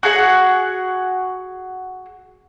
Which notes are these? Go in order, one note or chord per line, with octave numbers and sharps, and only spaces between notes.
F#4 G#4 F#5